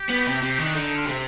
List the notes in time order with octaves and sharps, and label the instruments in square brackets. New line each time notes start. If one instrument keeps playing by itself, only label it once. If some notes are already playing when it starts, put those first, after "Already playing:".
Already playing: [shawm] G4
[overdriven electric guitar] B3
C3
C3
D#3
[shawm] D4
[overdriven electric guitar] D3 [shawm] D#4
[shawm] F4
[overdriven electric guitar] C3 [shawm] C5